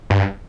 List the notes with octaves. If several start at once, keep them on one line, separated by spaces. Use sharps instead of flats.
G2